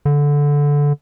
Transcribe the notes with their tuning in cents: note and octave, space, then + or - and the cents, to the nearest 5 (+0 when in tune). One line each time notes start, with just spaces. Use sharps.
D3 -15